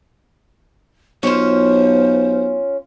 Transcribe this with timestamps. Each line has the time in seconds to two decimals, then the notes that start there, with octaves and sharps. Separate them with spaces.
1.23 B1 C#4 F4 C5